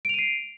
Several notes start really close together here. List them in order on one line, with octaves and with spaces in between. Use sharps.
D7 F7 D#7 C7